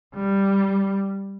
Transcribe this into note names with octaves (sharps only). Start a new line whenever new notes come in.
G3